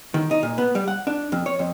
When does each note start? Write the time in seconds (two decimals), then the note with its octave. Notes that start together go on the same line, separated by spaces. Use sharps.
0.14 D#3
0.31 D#4
0.43 A#2
0.58 B3
0.75 G3
0.88 F#5
1.07 D4
1.32 F2
1.46 C#5
1.59 F2